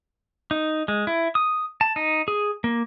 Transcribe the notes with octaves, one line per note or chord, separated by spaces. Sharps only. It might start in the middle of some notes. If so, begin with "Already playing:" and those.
D#4
G#3
E4
D#6
A5
D#4
G#4
A#3